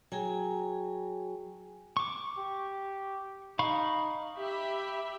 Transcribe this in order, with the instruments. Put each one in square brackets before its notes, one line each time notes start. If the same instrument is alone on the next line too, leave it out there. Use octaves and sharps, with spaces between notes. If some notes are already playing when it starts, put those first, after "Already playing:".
[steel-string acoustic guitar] F#3 [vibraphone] G#4 G5 G#5
[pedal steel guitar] C#6 D6
[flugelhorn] G4
[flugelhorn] D#4 [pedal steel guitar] F5 B5 C#6
[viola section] G4 E5 B5